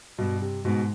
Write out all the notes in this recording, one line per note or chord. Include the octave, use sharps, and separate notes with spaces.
G2 B2
C3
G#2 B2